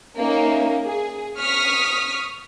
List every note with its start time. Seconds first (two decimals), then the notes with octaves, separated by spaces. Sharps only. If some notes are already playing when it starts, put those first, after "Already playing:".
0.18 A#3 C#4 D#4 E5
0.82 G#4
1.38 C#6 D#6 F6 B6